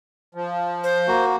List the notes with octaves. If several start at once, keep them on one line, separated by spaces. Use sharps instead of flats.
F3
C5
A#3 F#4